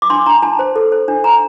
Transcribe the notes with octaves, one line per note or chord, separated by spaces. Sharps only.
D6
D4 C6
D4 A#5
D4 A5
C5
A4
C5
D4
D4 A#5